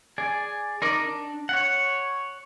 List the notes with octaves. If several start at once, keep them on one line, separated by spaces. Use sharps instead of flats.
G#4 D5 G#5
D#4 A#4 D5
D4
C#5 F#5